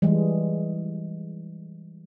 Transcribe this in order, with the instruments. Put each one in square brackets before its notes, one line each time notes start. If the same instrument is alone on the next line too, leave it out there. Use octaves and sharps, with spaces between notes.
[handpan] E3 G3 G#3